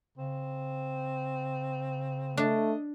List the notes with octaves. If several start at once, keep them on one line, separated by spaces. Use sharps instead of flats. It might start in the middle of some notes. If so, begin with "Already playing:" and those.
C#3 C4
A3 D4 D#5